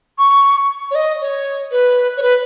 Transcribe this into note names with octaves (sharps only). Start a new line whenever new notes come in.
C#6
C#5
D#5
C#5
B4
C#5
B4